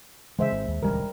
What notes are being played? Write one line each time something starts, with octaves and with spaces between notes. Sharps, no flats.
C#3 E3 G#3 C5 E5
G#1 D#3 C4
D#2
D#1 C#2 E3 G3 A#4